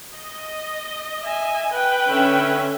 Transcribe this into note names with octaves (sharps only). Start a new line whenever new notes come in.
D#5
E5 G#5
B4 G5
D3 C#4 E5